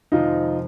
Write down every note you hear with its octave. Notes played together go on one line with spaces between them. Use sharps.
F2 C3 D#3 G#3 C4 D#4 F4